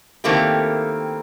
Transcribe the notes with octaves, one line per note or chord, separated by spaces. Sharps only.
D#3 A3 A#3 C4 E4 G4